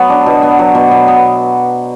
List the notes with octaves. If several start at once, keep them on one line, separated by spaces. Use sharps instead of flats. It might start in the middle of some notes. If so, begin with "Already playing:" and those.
Already playing: F#3 B3
D4
B2
B3
F#3
B2
B2
B3